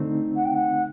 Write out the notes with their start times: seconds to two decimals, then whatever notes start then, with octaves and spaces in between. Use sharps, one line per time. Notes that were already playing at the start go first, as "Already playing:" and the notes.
Already playing: D3 A3 C4 D#4
0.35 F#5
0.44 G5
0.54 F#5